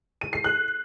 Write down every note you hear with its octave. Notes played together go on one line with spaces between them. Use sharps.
D#7
C7
F#6